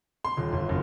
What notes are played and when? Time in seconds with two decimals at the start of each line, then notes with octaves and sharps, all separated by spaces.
0.25 C6
0.37 D#1
0.53 G1
0.69 F#1